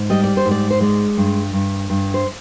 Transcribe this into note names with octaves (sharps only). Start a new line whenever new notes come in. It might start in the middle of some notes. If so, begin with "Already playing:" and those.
Already playing: G#2
G3 D#5
D5
C5
G#2
D5
C5
G#3 D5
G2
G2
G2
C5